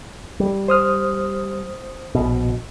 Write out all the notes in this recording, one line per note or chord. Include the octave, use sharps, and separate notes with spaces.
G3
C5 D#6 F6
A#1 B2